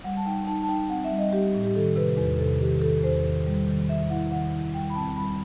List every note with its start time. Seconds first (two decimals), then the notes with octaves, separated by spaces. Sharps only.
0.04 G3 F#5
0.17 A5
0.26 D#4 G5
0.47 D#4 A5
0.63 A5
0.68 D#4 G5
0.89 C4 F#5
1.04 E5
1.11 G3
1.18 D#5
1.32 G3 G4
1.54 A2
1.64 G4
1.75 D#3 A4
1.96 C3 B4
2.17 E2 B4
2.39 C3 A4
2.60 D#3 G4
2.81 D#3 A4
3.03 E2 C5
3.25 D#3
3.46 G3
3.67 D#3
3.89 D#3 E5
4.10 E4 F#5
4.31 D#3 F#5
4.53 E4
4.74 G3 G5
4.90 B5
4.95 C4 A5
5.16 G3 B5